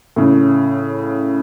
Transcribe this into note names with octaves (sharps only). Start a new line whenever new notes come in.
A2 C#3